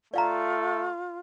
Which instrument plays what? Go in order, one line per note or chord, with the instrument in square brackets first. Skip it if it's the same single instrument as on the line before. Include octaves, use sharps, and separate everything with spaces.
[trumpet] A3 [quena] F4 [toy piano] D5 F5 A#5